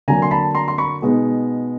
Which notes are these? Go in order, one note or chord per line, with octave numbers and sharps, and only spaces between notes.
D3 F#3 A#3 G#5 A#5
C6
A5 B5
A#5 C6
C6
B5 C#6
B2 G#3 B3 D#4